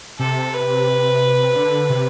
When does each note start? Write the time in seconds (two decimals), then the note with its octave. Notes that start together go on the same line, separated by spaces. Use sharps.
0.19 C3 A4
0.54 B4
1.56 D3
1.90 C3